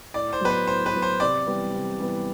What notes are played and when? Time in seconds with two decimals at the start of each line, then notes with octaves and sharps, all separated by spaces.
0.14 A2 D5
0.33 C5
0.41 F#3 B3 B4
0.50 C5
0.67 A2 C5
0.86 B4
0.94 F#3 B3
1.02 C5
1.20 C3 D5
1.47 E3 G3 B3
1.74 C3
2.00 E3 G3 B3